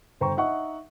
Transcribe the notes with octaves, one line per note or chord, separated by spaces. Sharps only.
G1 C5 G5 A#5 C#6
D#4 E5 F#5 C#6